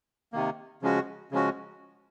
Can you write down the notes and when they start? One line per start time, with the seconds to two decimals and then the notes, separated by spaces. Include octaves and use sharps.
0.33 C3 D#3 A#3
0.82 C#3 F3 G#3 C#4 F#4
1.32 C#3 F3 G#3 C#4 F#4